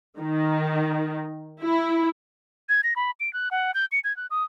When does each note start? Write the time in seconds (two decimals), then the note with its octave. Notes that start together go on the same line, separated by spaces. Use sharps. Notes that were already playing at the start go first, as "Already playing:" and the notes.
0.19 D#3
1.63 E4
2.69 G#6
2.84 A#6
2.96 B5
3.20 D7
3.33 F#6
3.51 F#5
3.74 G6
3.92 C#7
4.04 G#6
4.17 F#6
4.31 D#6